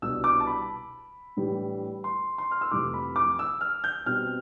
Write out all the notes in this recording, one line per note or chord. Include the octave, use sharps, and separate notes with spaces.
C2 B2 G3 D4 E6
D6
A5
B5
A2 E3 G3 D4
C6
C6
F6
E6
F2 C3 E3 A3 D6
B5
D6
E6
F6
G6
B2 G3 C4 F6